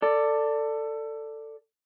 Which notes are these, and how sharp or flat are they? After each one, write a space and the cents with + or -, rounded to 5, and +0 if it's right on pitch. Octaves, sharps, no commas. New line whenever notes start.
A4 +20 D5 +0